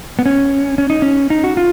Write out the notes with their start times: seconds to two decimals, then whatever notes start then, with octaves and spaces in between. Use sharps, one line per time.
0.19 B3
0.26 C#4
0.78 C#4
0.90 D#4
1.02 C#4
1.30 D#4
1.44 F#4
1.57 F4